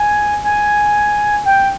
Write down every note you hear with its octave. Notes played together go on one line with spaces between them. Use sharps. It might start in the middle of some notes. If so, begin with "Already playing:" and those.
Already playing: G#5
G#5
G5